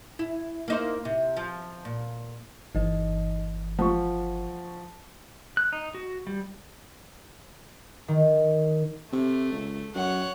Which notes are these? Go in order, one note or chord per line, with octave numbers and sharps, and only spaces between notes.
E4
A#3 D#4 C5
C3
F3
A#2
G1 E3 D#4 D#5
F3 F#5 C#6
F#6
D#4
F#4
G3
D#3
C3 A3
C#2
F#2 C#5 F#5